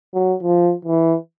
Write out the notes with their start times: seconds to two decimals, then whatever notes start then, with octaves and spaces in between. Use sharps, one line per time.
0.14 F#3
0.43 F3
0.85 E3